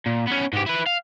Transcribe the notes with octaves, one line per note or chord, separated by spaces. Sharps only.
A#2
B3 C#4
G#2 G4
E4 B4
F5